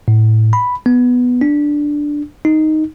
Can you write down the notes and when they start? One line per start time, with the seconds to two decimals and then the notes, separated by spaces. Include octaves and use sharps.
0.08 A2
0.53 B5
0.86 B3
1.41 D4
2.45 D#4